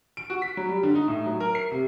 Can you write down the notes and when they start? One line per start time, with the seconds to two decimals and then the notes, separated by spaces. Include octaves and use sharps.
0.17 D7
0.30 F#4
0.42 B6
0.57 F#3
0.69 G3
0.83 D3
0.95 D#4
1.08 A2
1.26 F#3
1.40 A#4
1.55 C7
1.72 C3